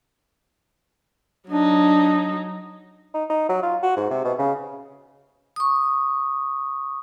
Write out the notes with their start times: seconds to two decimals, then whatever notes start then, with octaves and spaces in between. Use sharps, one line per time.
1.50 F#3 D4 D#4
3.14 D#4
3.30 D#4
3.49 F#3
3.63 F4
3.83 F#4
3.97 G#2
4.10 C3
4.24 B2
4.38 C#3
5.56 C#6 D#6